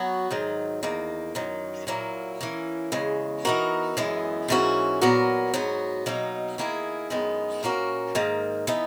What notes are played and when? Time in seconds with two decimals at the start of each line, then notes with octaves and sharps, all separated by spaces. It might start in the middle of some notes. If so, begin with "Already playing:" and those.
Already playing: F#3 B3 F#4
0.31 G#2 D#3 F#3
0.83 E2 D#3 A#3
1.35 F#2 D#3 F#3
1.87 A#2 F#3 A#3 E4
2.41 E3 A#3 C#4
2.92 E2 C#3 G#3
3.45 E3 B3 D#4 F#4 A#4
3.97 F#2 E3 G#3 B3
4.48 G#2 E3 A#3 C#4 F#4
5.01 A#2 F#3 B3 F#4 A#4
5.54 G#2 F#3 B3 F#4
6.06 B2 F#3 A#3 D#4
6.58 D#3 A#3 E4 G#4
7.10 F#2 D#3 G#3 B3
7.63 A#2 A#3 C#4 F#4 A#4
8.15 G#2 D#3 A#3
8.67 E3 B3 D#4